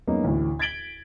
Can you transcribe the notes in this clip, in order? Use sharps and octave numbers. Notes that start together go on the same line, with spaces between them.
F#2 G#3 A#3 B3 C#4 D#4
A1 D2 A2
G#6 A6 B6 D7 F#7 G7